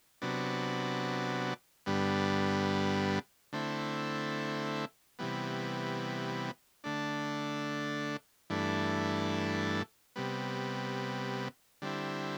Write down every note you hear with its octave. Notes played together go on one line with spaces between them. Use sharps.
C3 F#3 B3 D4
G2 D3 G3 B3
D3 A3 C4 E4
C3 E3 G3 B3
D3 A3 D4
G2 E3 A3 D4
C3 G3 B3
D3 G3 C4 E4